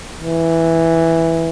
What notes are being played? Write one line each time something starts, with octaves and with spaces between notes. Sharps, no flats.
E3